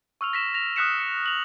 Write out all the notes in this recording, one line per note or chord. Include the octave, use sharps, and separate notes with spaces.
C#6 E6 F6 F7
A#6 B6 E7
A#6 F7
D#6 F6 F#6 B6 C#7 E7
C#7
F7 F#7